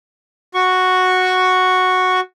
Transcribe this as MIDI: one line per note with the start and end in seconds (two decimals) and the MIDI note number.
0.54 2.20 66
0.54 2.20 85